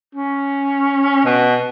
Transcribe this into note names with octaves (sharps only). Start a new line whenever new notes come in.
C#4
B2